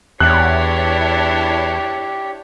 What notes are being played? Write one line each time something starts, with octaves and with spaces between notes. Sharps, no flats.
E2 D4 E4 G4 C#5 F#6